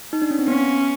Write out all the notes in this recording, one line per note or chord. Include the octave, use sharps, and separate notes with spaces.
D#4
D4
C#4
C4
B3 C#4